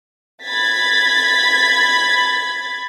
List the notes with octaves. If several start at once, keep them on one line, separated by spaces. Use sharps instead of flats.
B5 G#6 A6 B6